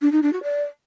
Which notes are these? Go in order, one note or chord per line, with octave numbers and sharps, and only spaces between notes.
D4
D#4
D4
F#4
D5